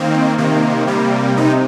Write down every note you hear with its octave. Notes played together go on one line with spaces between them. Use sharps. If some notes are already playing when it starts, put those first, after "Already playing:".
Already playing: D#3 A#3 C4
C3 D#3 A#3
C3 G3 A#3
C3 D#4